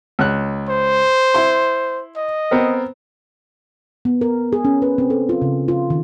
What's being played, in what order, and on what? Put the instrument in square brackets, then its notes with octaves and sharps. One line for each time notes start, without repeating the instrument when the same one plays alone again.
[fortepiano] C#2 F#6
[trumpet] C5
[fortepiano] E4 C6
[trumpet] D#5
[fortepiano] B3 C4 A#4
[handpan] B3
A#4
G#4
C#4
B4
C4
A4
F4
C#3
F4
D#3